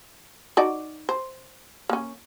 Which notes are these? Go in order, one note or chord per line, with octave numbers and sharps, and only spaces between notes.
D#4 F#4 D5
C5
A#3 C#4